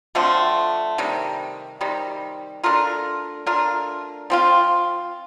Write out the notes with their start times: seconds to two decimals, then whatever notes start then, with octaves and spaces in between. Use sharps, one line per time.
0.15 D3 F3 A3 C4
0.98 C3 D#3 G3
1.81 C3 D#3 G3
2.63 A3 D4 F4 A#4
3.46 A3 D4 F4 A#4
4.30 F3 C4 F4